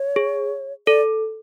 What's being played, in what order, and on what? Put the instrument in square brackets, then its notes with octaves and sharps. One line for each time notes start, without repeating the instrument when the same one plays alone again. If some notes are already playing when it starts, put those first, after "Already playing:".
Already playing: [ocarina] C#5
[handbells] G#4
[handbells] A4 [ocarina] D5